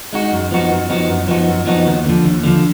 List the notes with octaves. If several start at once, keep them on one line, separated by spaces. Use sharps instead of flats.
G#3 D#4 F#4
F#2
F3 B3 D#4 F#4
F#2
F3 B3 D#4 F#4
F#2
F3 B3 D#4 F#4
F#2
F3 B3 D#4 F#4
D#2
D3 F3
D#2
D3 F3